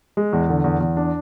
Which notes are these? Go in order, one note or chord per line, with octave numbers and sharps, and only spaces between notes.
G#3
E2
D3
E2
E2
D4